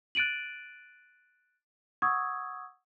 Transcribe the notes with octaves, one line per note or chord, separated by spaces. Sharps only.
F#6 A6 D7 D#7 F#7
F#5 C#6 D#6 E6 G#6